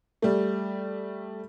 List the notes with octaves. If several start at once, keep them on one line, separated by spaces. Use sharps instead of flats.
G3 A3